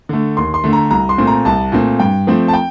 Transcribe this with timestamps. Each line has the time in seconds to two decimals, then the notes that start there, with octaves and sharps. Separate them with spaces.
0.09 D3 A3
0.37 D#2 C6
0.54 C6
0.64 D3 A3
0.73 A#5
0.91 C2 A#5
1.09 C6
1.18 A#2 A3 C4
1.27 A#5
1.45 C2 A5
1.72 A#2 A3 C4
2.00 G2 G5
2.27 F3 A3 C4
2.48 A5
2.54 G5